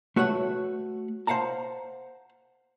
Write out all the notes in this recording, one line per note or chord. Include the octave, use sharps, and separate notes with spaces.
A3 F#4 B4 C#5 F#5
C5 F5 F#5 A5 A#5